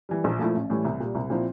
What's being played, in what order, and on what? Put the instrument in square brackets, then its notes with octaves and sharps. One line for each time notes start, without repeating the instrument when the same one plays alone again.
[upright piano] E3 G3
A#1
A#2 F3 A3 E4
A1
A2 E3 G3
C2
A#2 G3
C2
A#2 F3 C4 E4